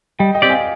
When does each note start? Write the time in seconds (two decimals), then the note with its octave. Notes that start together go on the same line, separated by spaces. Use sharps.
0.19 G3 D#5 G5
0.35 D#5 G5
0.42 C4 G4 D5
0.50 F5 G#5